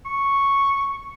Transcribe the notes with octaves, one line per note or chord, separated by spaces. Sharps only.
C#6